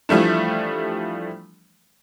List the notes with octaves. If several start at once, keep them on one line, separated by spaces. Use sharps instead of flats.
E3 F3 G3 A3 D4